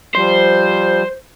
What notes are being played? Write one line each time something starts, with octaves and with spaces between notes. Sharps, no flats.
F3 G3 C5